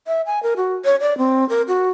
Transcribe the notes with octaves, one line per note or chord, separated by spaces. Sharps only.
E5
G#5
A#4
F#4
C#5
D5
C4
A#4
F#4